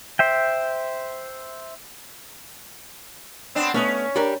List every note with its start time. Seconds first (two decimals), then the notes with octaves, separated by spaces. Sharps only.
0.19 C5 E5 G5
3.55 B3 C4 D4
3.74 A3 B3 C#4 D#5
4.16 G3 D4 A#4